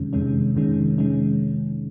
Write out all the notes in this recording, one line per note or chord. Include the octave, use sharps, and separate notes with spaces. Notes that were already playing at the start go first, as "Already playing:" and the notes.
Already playing: F2 C3 D#3 G#3 C#4
F2 C3 D#3 G#3 C#4
F2 C3 D#3 G#3 C#4
C3 D#3 G#3 C#4